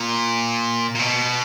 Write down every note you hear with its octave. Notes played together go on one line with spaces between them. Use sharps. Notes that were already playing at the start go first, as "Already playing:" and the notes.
Already playing: A#2
A#2
B2